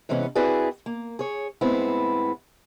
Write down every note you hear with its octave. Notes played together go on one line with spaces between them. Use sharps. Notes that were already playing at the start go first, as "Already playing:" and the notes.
C3 E3 G#3 B3 C#4
C4 E4 F#4 G#4 B4 D5
A#3
G#4 C#5
A2 G#3 B3 C4 E4